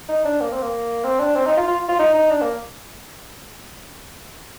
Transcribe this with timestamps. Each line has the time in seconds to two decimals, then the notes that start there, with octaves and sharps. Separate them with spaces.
0.09 D#4
0.25 D4
0.41 A#3
0.52 C4
0.62 A#3
1.04 C4
1.20 D4
1.36 C4
1.46 D#4
1.57 F4
1.68 F4
1.89 F4
1.99 D#4
2.15 D#4
2.31 D4
2.42 A#3